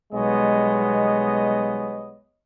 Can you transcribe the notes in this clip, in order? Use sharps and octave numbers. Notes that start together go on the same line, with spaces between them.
B1 G3 G#3 B3 C#5 D#5